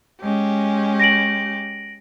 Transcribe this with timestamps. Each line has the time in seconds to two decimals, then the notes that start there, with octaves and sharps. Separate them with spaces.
0.21 G#3 C#4 G4
1.00 A#6 D7 F#7